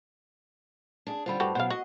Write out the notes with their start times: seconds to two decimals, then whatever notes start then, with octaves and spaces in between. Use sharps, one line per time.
1.07 D4 G#4
1.26 D3 G3 F4 C5 B5
1.40 G2 F#4 G4 A4
1.55 F#2 B2 C5 F5 F#5
1.70 F#4 D#5